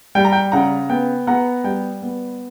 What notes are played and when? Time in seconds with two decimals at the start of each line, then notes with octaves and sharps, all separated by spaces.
0.15 G3 G5
0.25 A#5
0.32 G5
0.52 C#3 F#5 A#5
0.89 B3 G5
1.27 B3 F#5 A#5
1.64 G3 G5
2.02 B3